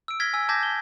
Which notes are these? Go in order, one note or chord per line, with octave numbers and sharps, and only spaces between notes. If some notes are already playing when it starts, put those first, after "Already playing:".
E6 D7
F6 G#6 A#6 B6 G7
G#5 E6 B6
A5 D6 G6 G#6 A#6 B6
G7